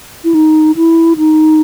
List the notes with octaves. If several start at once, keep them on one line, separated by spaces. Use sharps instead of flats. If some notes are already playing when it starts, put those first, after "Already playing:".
E4
D#4
E4
D#4